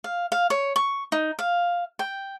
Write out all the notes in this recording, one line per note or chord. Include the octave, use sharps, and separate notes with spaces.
F5
F5
C#5
C#6
D#4
F5
G5